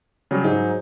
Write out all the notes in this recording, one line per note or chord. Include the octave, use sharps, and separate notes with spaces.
C#3 F#3 G3
G#2 F#3 D#4